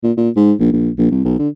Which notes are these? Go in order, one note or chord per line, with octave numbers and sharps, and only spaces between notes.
A#2
A#2
G#2
A#1
A#1
A#1
C2
B1
D3